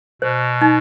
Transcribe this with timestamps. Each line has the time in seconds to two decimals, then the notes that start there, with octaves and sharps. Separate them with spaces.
0.22 B2 C5
0.61 D#4